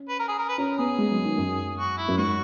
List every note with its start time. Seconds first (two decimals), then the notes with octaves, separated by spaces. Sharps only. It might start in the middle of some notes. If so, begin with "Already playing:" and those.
Already playing: C#4
0.09 B4
0.19 A#4
0.28 G#4
0.39 A#4
0.49 B4
0.58 C#4 A#4
0.78 B3 G#4
0.99 G#3
1.11 F#3
1.24 D#3
1.38 F#2
1.77 F#4
1.97 E4
2.08 F#2
2.18 G#2 F#4